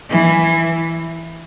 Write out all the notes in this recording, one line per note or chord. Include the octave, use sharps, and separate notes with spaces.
E3